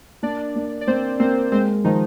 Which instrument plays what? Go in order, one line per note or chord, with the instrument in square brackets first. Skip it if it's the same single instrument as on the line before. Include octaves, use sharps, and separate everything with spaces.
[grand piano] A#3 [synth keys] D4 D5
[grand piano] A#3
[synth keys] D5
[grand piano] A#3 [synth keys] C4 C5
[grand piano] A#3 [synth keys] C4 C5
[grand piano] G#3 [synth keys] C4 C5
[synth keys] D#3 D#4 [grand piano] F3